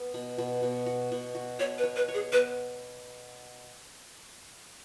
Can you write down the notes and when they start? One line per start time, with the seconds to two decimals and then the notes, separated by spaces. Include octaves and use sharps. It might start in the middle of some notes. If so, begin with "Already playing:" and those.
Already playing: B3
0.14 B2
0.38 B2
0.63 B2
0.86 F#4
1.12 B2
1.35 F#4
1.60 B2 C#5
1.78 B4
1.83 C#5
1.96 B4
2.08 C#5
2.14 G#4
2.32 B3 B4